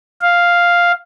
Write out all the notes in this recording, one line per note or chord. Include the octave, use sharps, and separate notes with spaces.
F5